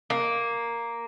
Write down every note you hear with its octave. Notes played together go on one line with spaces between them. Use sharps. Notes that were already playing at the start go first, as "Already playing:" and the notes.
A#3